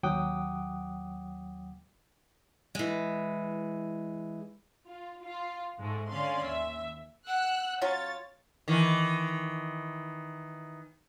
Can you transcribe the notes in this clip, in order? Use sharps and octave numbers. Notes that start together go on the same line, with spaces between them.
D#2 F#3 F#5 G5 D6 D#6
E3 G#3
F4
F4
G#2 G#3 A3
D3 C#4 D5 F5 C6
D#2 E5
F#5 E6 F#6
F#3 C#4 F4 C#5 A6
D#3 E3